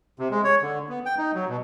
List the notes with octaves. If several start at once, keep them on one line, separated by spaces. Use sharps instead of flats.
C3
G#3
C#5
D3
B3
G5
D#4
F#3
B2